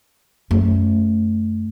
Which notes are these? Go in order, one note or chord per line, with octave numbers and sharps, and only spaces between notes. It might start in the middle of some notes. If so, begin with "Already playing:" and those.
F#2 A3